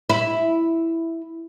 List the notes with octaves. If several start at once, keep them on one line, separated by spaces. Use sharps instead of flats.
E4